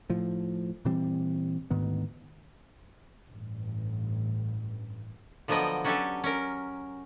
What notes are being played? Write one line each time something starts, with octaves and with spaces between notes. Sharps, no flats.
A2 F3
A#2 E3 G3 C4
D2 G#2 D#3 B3
A1 G2
D3 F3 F#3 B3 D#5 G5
F#3 C#4 D4 G4 A4 G#5
C#4 A#4